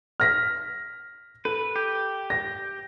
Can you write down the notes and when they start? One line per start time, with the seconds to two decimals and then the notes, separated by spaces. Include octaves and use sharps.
0.20 F6 A#6 B6
1.45 A4 B4
1.76 G4
2.30 A#6